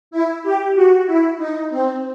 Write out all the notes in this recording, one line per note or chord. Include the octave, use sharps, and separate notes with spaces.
E4
G4
F#4
E4
D#4
C4